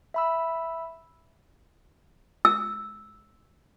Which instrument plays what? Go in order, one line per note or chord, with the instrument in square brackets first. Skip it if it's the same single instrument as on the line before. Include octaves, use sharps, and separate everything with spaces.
[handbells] E5 B5 E6
[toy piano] E6